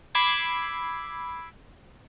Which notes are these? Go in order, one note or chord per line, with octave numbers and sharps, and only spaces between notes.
B5 D6 E6 G#6 C7